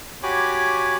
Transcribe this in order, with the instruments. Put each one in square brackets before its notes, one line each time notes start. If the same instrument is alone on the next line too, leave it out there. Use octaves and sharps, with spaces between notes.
[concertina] F#4 G4 C#5 G#5 B5 D6